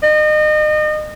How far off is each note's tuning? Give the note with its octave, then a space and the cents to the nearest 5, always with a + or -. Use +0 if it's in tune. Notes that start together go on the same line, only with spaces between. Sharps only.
D#5 -35